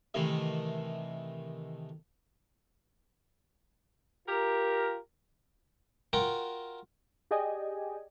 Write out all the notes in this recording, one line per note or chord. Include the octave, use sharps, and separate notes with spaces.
C3 D#3 E3 A3
F4 G4 A#4
F4 F#4 A#4 G5
G4 G#4 D5 D#5 G5 G#5